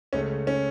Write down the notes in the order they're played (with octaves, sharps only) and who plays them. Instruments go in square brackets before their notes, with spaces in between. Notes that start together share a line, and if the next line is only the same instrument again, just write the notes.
[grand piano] C#2 C#3 A3 C#4
C#4